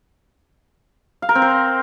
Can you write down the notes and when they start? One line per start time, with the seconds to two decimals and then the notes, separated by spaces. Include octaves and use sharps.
1.22 F5
1.29 A#4
1.35 C4
1.42 C5